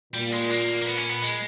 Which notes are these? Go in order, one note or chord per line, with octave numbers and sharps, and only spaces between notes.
A#2 G3
G#3
A#3
A#3
B3
C#4
B3
G#3